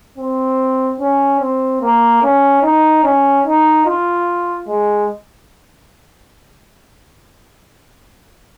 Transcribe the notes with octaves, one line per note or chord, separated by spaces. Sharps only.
C4
C#4
C4
A#3
C#4
D#4
C#4
D#4
F4
G#3